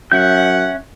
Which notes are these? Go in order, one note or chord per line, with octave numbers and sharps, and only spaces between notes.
F#2 C#4 E5 F#5 G6